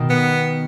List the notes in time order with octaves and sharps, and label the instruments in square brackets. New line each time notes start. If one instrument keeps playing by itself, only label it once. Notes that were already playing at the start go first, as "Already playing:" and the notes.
Already playing: [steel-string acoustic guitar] B2 D#3
[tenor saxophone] B3